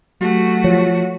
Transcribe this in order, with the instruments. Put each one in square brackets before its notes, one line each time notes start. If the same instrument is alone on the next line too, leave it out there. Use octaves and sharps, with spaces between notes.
[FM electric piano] F#3 G4 [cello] A3 F#4
[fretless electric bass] F3 [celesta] C#5